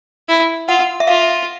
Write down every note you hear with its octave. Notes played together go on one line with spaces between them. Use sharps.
E4
F4 F#5
E5
F4 F5